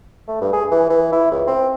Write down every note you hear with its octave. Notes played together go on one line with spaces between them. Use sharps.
A3
G2
G#4
E3
E3
E4
C#2
C4